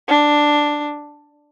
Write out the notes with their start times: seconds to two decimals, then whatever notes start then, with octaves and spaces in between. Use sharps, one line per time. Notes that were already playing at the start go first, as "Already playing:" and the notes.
0.08 D4